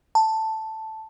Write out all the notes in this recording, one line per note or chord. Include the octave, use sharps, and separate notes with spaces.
A5